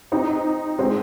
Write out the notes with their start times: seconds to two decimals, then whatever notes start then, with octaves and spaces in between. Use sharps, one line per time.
0.12 C4 D#4
0.78 G#3 C4